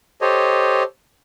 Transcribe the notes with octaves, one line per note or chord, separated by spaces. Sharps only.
G4 A4 C5 C#5 D#5